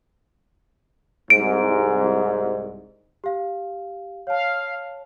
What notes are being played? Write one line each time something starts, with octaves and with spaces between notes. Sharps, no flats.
C2 G#2 D7
G4 F5
C#5 F5 A5